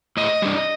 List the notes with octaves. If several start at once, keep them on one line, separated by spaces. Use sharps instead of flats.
A2 D#5
G3 D4